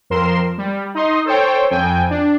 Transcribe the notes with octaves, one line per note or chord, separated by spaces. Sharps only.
F2 A#4 C6 E7
G3
D#4 D#5 C6
A4 C5 C#5 G5
F2 G5 G#5
D4